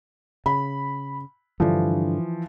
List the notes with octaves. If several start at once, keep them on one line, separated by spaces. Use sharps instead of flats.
C#3 B5
G2 D3 E3 F3